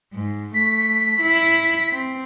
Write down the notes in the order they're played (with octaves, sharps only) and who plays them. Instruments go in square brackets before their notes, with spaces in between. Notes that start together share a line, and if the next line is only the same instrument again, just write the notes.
[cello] G#2
[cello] A3 [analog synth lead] B6
[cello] E4
C4